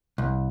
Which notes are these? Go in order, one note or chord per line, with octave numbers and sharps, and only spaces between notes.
C2